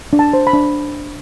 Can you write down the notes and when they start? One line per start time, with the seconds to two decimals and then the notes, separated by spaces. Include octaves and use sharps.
0.13 D4
0.19 A5
0.33 C5
0.47 B5
0.53 D4